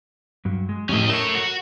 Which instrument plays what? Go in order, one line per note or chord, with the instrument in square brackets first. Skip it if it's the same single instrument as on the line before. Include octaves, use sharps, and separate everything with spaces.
[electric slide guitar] G2 F#3
G#3
[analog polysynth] F2 A2 [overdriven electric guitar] C#4 D#5 [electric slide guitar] G4
[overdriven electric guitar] A3 C#5 [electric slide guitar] A#4 [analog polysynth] E7
[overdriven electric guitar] F#4